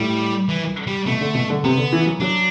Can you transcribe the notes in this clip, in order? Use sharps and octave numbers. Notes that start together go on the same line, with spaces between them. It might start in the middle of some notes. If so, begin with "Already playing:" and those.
Already playing: A2 G3
E3
G3
B2 A3
D3
B2
D3
C3 B3
D3
E3
F#3
F#3 D4